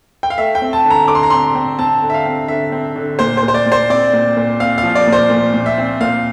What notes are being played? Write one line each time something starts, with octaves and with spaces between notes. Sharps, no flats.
G5
F5
A3 E5
G5
C4
A5
D3
A#5
D3 D6
C6
A#5
C4 C6
C4
C4 A5
D3
E5
F5
C4
D3 E5
C4
D3
A#2 C5
C5
A#2
C5
D5
A#2
C5
C4 D5
A#2
A#2
C4 F5
F5
F3
D5
A#2
C5
A#2
A#2
E5
C4
A#2 F5